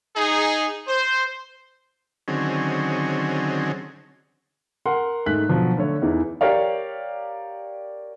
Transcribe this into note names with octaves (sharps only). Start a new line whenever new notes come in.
D#4 G#4
C5
D3 D#3 F#3 C4 C#4 G#4
A#4 F#5 C6
G#2 A3 F#6 B6
B2 D3 F3 F#3
D3 A3 C#5
E2 E3 D#4 E4
G4 A#4 C#5 D5 F5